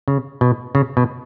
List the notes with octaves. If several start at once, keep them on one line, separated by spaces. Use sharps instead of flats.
C#3
B2
C#3
B2